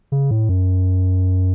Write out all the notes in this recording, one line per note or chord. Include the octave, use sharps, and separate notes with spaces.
C#3
A2
F#2